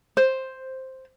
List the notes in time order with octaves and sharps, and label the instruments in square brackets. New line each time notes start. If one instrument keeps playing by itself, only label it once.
[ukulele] C5